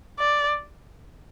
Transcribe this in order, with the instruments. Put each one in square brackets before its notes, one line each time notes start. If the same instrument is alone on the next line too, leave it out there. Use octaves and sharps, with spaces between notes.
[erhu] D5